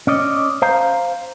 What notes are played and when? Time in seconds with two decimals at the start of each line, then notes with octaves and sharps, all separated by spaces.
0.07 C#4 D5 D#5
0.62 C5 F5 A#5